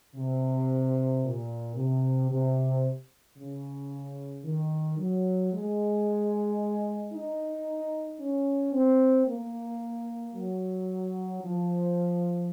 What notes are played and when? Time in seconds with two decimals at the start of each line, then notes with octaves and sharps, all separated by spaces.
0.15 C3
1.23 A#2
1.76 C3
2.30 C3
3.37 C#3
4.45 D#3
4.98 F#3
5.52 G#3
7.13 D#4
8.20 C#4
8.73 C4
9.27 A#3
10.34 F#3
11.42 F3